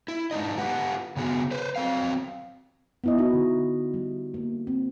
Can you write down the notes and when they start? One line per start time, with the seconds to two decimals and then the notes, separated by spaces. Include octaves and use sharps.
0.08 E4
0.31 G#3 D4 D#4 D#5
0.58 F4 G4 B4 F#5
1.17 C#3 B3 F#4 G#4
1.51 B4 C5
1.76 F#3 C4 F5
3.04 B3 E4 D#5
3.18 D#4 F#4
3.33 D3
3.94 G3
4.34 A#3
4.67 C4